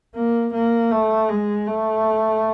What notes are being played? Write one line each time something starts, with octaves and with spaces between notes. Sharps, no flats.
A#3
A#3
A3
G#3
A3